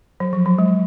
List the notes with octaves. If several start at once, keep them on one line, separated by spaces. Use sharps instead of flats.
F#3
F3
F#3
G#3